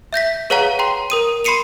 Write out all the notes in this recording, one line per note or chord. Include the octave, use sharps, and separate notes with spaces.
E5 G6 A#6 B6
G#4 B4 C#5 F5 F#5 A#5
G5 A#5 C6
A#4 D#6 D#7
B5 C6 C7 C#7 D#7 F7